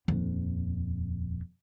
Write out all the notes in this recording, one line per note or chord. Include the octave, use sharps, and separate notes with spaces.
D#1 F2